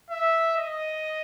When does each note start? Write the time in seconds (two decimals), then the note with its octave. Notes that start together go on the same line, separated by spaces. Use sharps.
0.11 E5
0.57 D#5